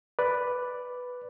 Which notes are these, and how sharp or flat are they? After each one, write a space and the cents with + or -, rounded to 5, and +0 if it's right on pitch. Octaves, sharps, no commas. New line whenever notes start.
B4 +0 D5 +0